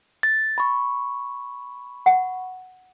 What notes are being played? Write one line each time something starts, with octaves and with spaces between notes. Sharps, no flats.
A6
B5 C#6
F#5